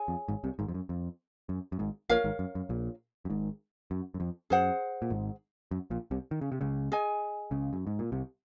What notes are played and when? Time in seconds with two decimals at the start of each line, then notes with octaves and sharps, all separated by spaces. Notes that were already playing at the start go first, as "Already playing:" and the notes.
Already playing: G#4 C#5 G#5
0.08 F2
0.28 G#1 G#2
0.44 C2 C3
0.59 G#1 G#2
0.68 F2
0.74 F#2
0.89 F2
1.49 F#2
1.72 F#2
1.79 G#1 G#2
2.09 A#1 A#2 A#4 C#5 F5
2.24 G#1 G#2
2.39 F#2
2.55 F#2
2.69 A#1 A#2
3.25 F#2
3.30 G#1 G#2
3.91 F#2
4.14 F#2
4.20 F2
4.50 F#2 G#4 C5 F#5
5.02 A#2
5.10 G#1 G#2
5.71 F#2
5.90 A#1 A#2
6.11 C2 C3
6.31 D#3
6.41 C#3
6.52 C3
6.61 C#2 C#3
6.92 G#4 D#5 G#5
7.51 C#2 C#3
7.73 F#2
7.87 G#2
7.99 A#2
8.12 C2 C3